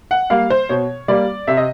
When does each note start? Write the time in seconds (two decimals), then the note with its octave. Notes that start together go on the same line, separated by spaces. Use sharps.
0.11 F#5
0.30 G3 A#3 F5
0.50 C5
0.69 B2 C#5
1.08 G3 A#3 D5
1.47 C3 E5
1.57 D#5